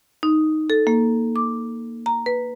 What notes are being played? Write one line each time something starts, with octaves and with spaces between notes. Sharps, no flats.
D#4
A4
A#3
D6
A#5
B4